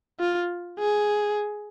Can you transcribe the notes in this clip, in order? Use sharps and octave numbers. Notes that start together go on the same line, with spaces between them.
F4
G#4